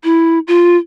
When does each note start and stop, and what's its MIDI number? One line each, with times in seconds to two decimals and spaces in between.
0.04 0.39 64
0.48 0.77 65